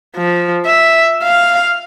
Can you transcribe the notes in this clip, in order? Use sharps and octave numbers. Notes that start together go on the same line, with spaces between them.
F3
E5
F5